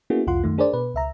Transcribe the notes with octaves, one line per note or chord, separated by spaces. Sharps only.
A#3 B3 C#4 E4 F#4 G#4
C2 F2 F4 F#5 C6
F#2 D#3 A3
D4 G#4 A#4 C5 D5
B2 B4
C#2 E5 A#5